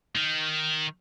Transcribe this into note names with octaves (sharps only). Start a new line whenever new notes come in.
D#3